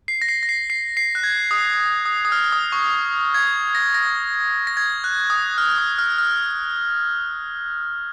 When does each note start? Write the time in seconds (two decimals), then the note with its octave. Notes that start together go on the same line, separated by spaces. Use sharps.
0.08 C7
0.22 A#6
0.29 C7
0.43 A#6
0.49 C7
0.70 C7
0.97 C7
1.15 F#6
1.23 G#6
1.51 D#6
2.05 D#6
2.25 D#6
2.32 F6
2.52 D#6
2.72 C#6
3.34 G#6
3.75 A#6
3.94 A#6
4.67 A#6
4.77 G#6
5.04 F#6
5.30 D#6
5.58 F6
5.78 D#6
5.98 F6
6.18 F6